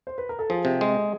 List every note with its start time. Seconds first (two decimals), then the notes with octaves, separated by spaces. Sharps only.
0.07 C5
0.18 B4
0.29 A#4
0.39 A4
0.50 F3 G#4
0.65 C3
0.81 G#3